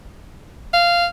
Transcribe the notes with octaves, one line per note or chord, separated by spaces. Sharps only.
F5